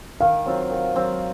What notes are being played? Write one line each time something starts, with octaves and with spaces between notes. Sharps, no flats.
D#3 F5
F#3 C4 F4
D#3
F#3 C4 F4